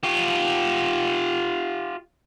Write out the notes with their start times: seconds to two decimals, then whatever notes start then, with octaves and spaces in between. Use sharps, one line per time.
0.04 F4 G4